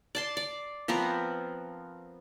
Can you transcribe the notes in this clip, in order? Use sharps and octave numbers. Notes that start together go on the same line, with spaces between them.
D5 A5 C6
D5
F3 B3 C4 A#4